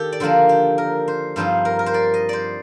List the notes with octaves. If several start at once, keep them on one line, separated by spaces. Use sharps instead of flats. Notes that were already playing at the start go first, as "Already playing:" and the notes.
Already playing: D#3 G4 A4
D5
D3 F3 A#3 D4 C5
G4
A#4
C5
G2 F3 C4 D#4 C5
A#4
A#4
C5
D5
D#5
C5 D5